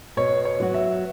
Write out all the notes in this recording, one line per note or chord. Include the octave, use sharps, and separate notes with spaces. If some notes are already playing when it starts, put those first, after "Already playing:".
B2 C#5
C#5
F#3 B3 F#4
E5